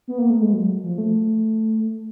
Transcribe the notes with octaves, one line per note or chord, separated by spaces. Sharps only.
B3
A#3
A3
G#3
F#3
F3
A3